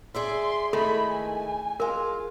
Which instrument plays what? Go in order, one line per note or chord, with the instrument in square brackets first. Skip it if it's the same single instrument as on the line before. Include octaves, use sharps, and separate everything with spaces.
[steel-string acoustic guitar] G#4 D5 E5 [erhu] C6
[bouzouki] D#3 G#3 E4 [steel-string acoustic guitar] A3 [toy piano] A4 [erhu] B5
[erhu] G#5
[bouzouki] G#3 F4 [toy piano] A#4